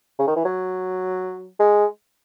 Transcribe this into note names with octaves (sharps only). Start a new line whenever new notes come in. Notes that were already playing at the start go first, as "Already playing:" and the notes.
C#3
D#3
E3
F#3
G#3